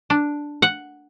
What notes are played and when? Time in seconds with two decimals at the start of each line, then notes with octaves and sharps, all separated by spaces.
0.10 D4
0.62 F#5